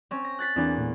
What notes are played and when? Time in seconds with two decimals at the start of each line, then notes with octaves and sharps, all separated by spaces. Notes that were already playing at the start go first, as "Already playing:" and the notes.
0.11 C4 C#4
0.24 A#6
0.39 F#6 A6 B6
0.56 E2 A#3 C4 D4 B5
0.78 A#2 A3 B3